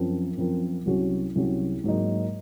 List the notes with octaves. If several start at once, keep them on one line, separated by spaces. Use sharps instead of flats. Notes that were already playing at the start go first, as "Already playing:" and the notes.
Already playing: F#2 F3 C4 F4 A#4
F#2 F3 C4 F4 A#4
C2 C3 F#3 C#4 F#4
C2 C3 F#3 C#4 F#4
G#2 F#3 A#3 D#4